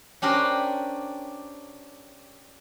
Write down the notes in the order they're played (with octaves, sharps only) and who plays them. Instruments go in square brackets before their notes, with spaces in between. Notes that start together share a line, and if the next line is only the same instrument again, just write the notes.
[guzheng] C#4 D4 G4 A#4 C5